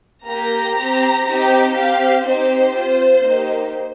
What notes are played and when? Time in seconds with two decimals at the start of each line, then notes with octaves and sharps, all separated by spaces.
0.24 A#3 G4 A#5
0.74 C4 G4
1.24 C4 D#4 G4
1.73 C4 G4 F5
2.23 C4 D#4 G4 C5
2.73 C4 F4
3.23 A#3 D#4 G4